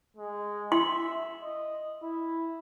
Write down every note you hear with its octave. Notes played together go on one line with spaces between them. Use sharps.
G#3
E5 C6
D#5
E4